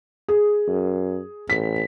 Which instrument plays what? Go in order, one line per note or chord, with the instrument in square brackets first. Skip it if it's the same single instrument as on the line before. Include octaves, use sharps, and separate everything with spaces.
[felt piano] G#4
[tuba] F#2
[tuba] A1 [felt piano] B6